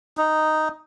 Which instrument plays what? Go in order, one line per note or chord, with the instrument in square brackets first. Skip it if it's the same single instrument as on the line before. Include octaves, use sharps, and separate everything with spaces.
[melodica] D#4